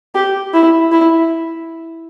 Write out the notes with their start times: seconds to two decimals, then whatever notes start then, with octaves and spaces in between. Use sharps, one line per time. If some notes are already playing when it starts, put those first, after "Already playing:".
0.15 G4
0.54 E4
0.92 E4